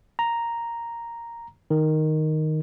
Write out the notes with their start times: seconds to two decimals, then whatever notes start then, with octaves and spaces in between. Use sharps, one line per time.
0.19 A#5
1.70 D#3